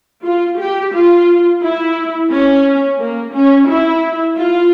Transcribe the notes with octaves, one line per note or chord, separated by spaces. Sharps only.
F4
G4
F4
E4
C#4
A#3
C#4
E4
F4